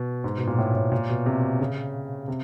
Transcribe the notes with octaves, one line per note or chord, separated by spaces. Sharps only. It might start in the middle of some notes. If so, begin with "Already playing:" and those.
Already playing: B2
G#2
B2
A#2
A2
A2
A#2
B2
C3
C#3
C3